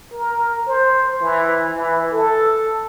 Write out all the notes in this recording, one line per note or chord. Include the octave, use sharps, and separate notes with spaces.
A#4
C5
E3
E3
A4